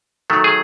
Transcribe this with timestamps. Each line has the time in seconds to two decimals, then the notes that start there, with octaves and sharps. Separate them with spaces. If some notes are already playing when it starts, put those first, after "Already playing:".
0.30 D#3 F#3 A3
0.44 G#4